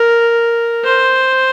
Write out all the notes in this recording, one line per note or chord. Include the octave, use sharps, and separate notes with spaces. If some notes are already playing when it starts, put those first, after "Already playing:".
Already playing: A#4
C5